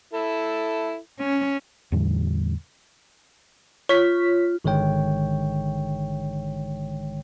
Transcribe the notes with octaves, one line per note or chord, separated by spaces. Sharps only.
E4 A4
C#4
E2 A2 D3 G3
F4 C#5 B6
G#1 D3 D#3 G#3 C#5 G5